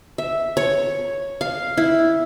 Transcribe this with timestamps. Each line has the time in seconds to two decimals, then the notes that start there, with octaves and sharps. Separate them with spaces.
0.18 E5
0.57 C#5
1.41 F5
1.77 E4